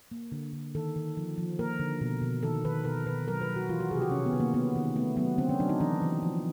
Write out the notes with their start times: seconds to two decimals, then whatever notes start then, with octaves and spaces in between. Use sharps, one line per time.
0.11 A#3
0.32 D3
0.53 D3
0.75 D#3 A4
0.96 D#3
1.17 F3
1.38 F3
1.59 A#3 A#4
1.80 D3
2.01 B2
2.22 B2
2.43 D#3 A4
2.64 D#3 B4
2.85 B2 A#4
3.06 B2 B4
3.28 F#3 A#4
3.41 B4
3.48 F#3
3.56 F#4
3.69 E3 F4
3.80 F#4
3.91 C3 G4 G#4
4.02 F#4
4.11 C3 C#4
4.26 B3
4.33 D#3
4.40 A#3
4.54 A#3 B3
4.76 D#3
4.96 A3 B3
5.17 F#3 B3
5.38 D3 C4
5.49 C#4
5.59 F#3 D4
5.69 D#4
5.81 E3 D4
6.02 E3
6.23 F3